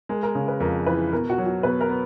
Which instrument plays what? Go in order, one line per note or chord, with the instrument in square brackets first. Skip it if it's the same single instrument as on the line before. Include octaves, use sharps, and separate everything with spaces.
[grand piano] G#3 [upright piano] A#4
[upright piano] A#4
[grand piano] C#3
[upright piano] B4
[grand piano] F2 [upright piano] A#4
[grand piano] E3 [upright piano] B4
[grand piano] B2 [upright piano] A#4
[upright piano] F#4
[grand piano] F#3
[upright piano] F#4
[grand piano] B2 [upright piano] B4
[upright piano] A#4
[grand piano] B3